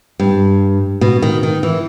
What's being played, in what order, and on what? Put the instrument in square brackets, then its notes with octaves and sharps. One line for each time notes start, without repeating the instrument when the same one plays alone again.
[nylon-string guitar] G2
B2
D#3
D#3
E3